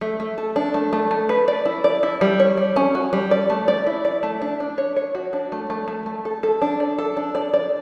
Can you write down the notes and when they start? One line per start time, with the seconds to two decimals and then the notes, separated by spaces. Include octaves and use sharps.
0.01 A3
0.20 A3
0.38 A4
0.56 D4
0.74 A3
0.93 A3
1.11 A3
1.29 B4
1.48 D5
1.66 E4
1.84 D5
2.03 E4
2.21 G3
2.40 C#5
2.57 G3
2.76 C#4
2.95 F#4
3.13 G3
3.31 D5
3.50 A3
3.68 D5
3.87 E4
4.05 D5
4.23 A3
4.42 D4
4.60 D4
4.78 C#5
4.96 C#5
5.15 F#4
5.33 D4
5.52 A3
5.70 A3
5.88 A3
6.06 A3
6.25 A4
6.43 A4
6.62 D4
6.80 D5
6.99 A4
7.17 D4
7.35 D5
7.54 D5